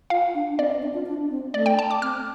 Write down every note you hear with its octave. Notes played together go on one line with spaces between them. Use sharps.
F4 F5
D4
C4 D5
C4
D4
F4
D4
C4
A3 D5
G5
A5
D6
C4 F6